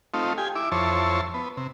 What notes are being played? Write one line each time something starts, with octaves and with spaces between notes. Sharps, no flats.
A3 C4 D#4 F4
G4 G#5
E4 D6
F2 E4 C5 C#5 A5
B3
C3